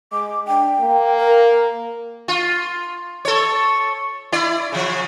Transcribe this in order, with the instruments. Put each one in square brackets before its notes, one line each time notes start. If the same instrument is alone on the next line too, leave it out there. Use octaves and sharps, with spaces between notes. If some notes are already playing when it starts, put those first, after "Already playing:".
[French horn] G#3 [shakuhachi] D6
[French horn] D4 [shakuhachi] G5
[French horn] A#3
[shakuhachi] A#4
[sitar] F4
A4 C#5
E4 D5
C#3 F3